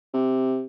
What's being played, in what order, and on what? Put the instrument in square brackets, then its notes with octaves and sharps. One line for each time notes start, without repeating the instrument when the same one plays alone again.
[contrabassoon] C3